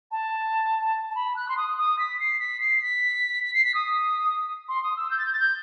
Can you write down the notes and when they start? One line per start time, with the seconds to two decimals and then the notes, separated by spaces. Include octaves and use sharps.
0.11 A5
1.10 A5
1.15 B5
1.36 F#6
1.49 C6
1.57 D#6
1.77 D#6
1.99 B6
2.20 C7
2.39 B6
2.60 C7
2.82 B6
3.44 B6
3.54 C7
3.64 B6
3.74 D#6
4.68 C6
4.83 D#6
4.96 E6
5.10 G6
5.18 A6
5.26 G6
5.33 A6
5.39 G6